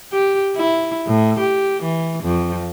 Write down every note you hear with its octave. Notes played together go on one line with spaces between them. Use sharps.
G4
E4
A2
G4
E3
F2